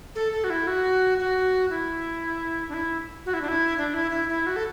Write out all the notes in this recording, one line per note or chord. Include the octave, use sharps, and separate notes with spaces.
A4
A4
F#4
E4
F#4
F#4
E4
D4
E4
F#4
E4
D4
E4
D4
E4
E4
E4
F#4
A4